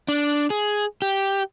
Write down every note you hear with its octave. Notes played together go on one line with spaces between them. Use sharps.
D4
G#4
G4